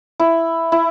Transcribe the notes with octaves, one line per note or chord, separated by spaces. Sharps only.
E4
E4